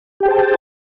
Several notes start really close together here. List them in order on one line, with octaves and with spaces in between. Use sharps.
G4 G5 G#4 C5 A5